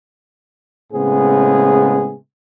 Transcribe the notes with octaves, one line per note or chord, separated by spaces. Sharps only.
A2 C#3 G#3 B3 C4 G#4